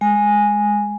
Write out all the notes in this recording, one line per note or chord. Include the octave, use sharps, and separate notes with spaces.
G#3 G#5